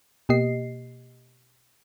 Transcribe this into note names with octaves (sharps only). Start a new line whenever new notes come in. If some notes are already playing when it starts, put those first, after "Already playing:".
B2 A#3 G4 D#5 C7